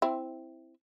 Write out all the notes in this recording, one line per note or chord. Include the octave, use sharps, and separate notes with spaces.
C4 E4